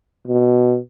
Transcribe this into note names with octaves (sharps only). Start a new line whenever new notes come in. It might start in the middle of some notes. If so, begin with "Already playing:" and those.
B2